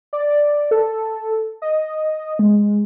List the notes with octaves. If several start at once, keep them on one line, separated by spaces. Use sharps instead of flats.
D5
A4
D#5
G#3